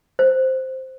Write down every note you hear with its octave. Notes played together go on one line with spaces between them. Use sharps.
C5